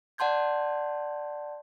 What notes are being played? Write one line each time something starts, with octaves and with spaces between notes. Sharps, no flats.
D5 F#5 A5 C6 G6 G#6